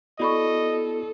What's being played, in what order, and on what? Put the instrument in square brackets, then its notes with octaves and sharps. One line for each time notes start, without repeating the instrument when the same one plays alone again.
[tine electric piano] B3 E4 F#4 [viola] A4 [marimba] D5 B5 C#6 [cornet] D#5